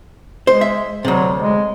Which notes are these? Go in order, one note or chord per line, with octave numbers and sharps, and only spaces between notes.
G#3 C5
E5
D2 C3 F#3
G#3